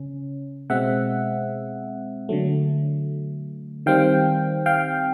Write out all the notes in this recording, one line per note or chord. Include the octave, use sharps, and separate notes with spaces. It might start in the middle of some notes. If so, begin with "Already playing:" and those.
Already playing: C#3 C#4
B2 G#3 C4 E5 F#5
D3 F#3 A3
D#3 G3 C4 F5 G5
F5 G5